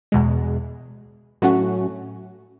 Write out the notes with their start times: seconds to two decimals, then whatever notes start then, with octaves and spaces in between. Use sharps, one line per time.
0.12 E2 B2 G#3
1.42 A2 F#3 A3 C#4 F#4